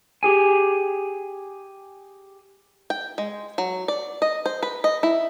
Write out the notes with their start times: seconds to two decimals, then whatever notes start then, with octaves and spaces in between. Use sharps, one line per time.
0.23 G4 G#4 G#5
2.90 G5
3.18 G#3
3.58 F#3
3.88 D5
4.22 D#5
4.46 C5
4.63 B4
4.84 D#5
5.03 E4